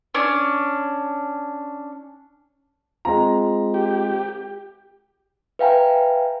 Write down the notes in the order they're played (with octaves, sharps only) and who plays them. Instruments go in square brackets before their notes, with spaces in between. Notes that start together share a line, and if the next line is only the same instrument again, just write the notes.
[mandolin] C#4 D4
[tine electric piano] G#3 C4 F4 [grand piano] A#5
[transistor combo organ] G4
[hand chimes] B4 E5 F5 G5 G#5 A#5